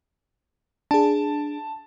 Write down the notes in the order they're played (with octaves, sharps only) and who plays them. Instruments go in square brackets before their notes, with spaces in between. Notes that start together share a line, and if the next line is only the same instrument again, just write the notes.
[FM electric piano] D4 G#4 [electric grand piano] A5